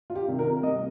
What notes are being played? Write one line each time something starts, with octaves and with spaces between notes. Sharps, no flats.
F4
G4
C3 D#3
A#4
C2 D#5